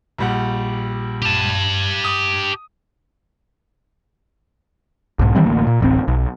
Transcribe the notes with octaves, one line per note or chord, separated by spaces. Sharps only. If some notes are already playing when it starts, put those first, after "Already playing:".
A#1 G3 F#5
G4 A5
D#6
B1 G#2
D#3 E3 G3 C4
A1 D2 A#3
A#2
D1 A1 C4
B1